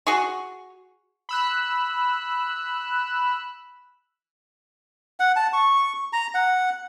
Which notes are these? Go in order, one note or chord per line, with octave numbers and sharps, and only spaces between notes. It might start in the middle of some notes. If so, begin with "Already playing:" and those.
F#4 G#4 C#6
B5 E6 F#6
F#5
A5
C#6
A#5
F#5